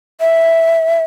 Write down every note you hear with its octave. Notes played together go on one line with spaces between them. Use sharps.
E5